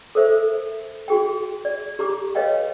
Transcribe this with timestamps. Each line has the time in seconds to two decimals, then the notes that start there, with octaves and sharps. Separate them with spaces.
0.15 A4 A#4 C5 E5
1.08 F#4 G#4 G5
1.65 D5
1.99 G4 A#5 D6
2.35 B4 C#5 D#5 F5 G5